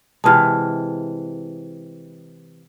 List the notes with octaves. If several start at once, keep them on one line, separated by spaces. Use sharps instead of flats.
C3 E3 G#3 A5 F6